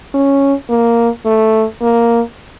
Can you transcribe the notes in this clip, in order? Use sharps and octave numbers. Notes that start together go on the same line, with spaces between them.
C#4
A#3
A3
A#3